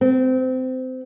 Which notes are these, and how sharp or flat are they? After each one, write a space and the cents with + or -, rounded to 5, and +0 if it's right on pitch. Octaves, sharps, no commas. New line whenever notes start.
C4 -25